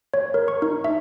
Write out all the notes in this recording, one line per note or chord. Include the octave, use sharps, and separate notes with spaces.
C#5
A#4
C#6
D#4
E5